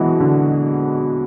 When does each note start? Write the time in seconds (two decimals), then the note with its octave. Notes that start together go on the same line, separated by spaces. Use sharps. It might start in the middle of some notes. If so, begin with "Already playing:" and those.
Already playing: B2 E3 F#3 G#3 F#4
0.20 D3